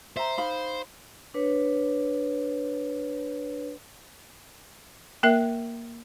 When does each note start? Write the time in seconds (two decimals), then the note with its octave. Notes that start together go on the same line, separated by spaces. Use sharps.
0.17 C5 E5 A#5
0.38 D#4 F5 B5
1.34 D4 B4 C#5
5.23 A#3 A#4 E5